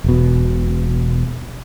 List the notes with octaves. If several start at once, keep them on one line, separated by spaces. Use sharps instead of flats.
E1 B2